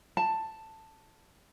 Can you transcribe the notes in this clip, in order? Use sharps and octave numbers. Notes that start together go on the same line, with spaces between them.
A5